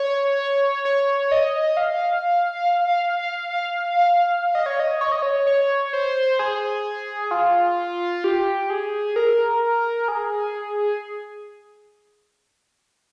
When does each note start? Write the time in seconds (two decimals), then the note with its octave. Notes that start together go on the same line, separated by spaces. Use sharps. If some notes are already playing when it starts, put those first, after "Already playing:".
Already playing: C#5
0.85 C#5
1.32 D#5
1.77 F5
4.55 D#5
4.66 C#5
4.80 D#5
5.01 C#5
5.12 D#5
5.23 C#5
5.47 C#5
5.93 C5
6.39 G#4
7.31 F4
8.24 G4
8.70 G#4
9.16 A#4
10.08 G#4